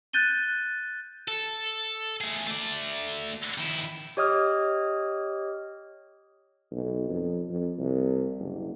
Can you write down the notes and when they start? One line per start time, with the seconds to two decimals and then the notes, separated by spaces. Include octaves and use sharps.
0.13 F#6 G6 A6 D#7 G7
1.28 A4
2.21 A3 G#4
2.47 A3 D5
3.58 D#3 E4
4.17 G4 C#5 D#5 D#6 F6
6.72 B1
7.09 F2
7.50 F2
7.79 C2
8.39 F#1